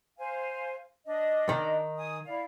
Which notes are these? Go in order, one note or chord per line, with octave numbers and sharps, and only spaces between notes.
C5 F5 G#5
D4 D#5
D#3
G#5 D#6
E4 D5 F5